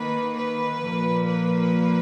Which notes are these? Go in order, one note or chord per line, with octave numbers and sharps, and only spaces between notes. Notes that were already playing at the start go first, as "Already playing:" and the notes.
Already playing: D#3 A#3 B4
B4
A#2 F3 A#3
B4